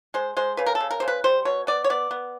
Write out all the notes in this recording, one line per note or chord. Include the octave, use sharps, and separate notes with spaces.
G#3 C5
G#3 C5
C#3 B4
A#4
A4
C#3
A#4
C#3 C5
B4
G3 C5
B2 C#5
B3 D5
C#5
B3 D5
B3